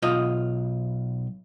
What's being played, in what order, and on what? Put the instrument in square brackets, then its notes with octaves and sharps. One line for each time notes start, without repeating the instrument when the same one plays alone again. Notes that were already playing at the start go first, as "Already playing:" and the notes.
[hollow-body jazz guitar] B1 F4 D#5